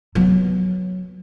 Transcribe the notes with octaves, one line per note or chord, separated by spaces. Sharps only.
F#3 B3